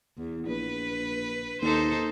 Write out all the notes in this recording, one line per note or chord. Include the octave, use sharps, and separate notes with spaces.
E2
A#1 B4
D#2 D#4 A4 C5